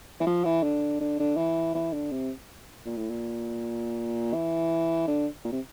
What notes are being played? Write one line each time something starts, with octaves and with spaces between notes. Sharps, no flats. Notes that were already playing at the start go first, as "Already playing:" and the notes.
E3
F3
E3
D3
D3
D3
E3
E3
D3
C3
A#2
A2
A#2
E3
D3
A#2
C3